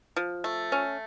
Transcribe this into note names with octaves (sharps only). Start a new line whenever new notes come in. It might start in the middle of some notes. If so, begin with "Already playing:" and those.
F3
A3
C#4